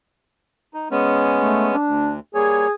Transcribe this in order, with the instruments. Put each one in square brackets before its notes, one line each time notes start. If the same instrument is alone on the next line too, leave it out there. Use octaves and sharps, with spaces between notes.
[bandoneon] D#4
G#3 B3 C#4
[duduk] A3
D4
[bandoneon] D2
[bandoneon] G3 A#3 C#5 [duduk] G#4